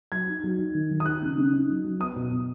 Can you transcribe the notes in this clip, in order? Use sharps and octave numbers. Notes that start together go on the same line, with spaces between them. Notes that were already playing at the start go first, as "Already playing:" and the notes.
F#3 G#6
D#4
F#3
D#4
D#3
D#3
D#6
D#4 F#6
C#3
C#3
D#4
F#3
F#3
B3 D#6
B2
B2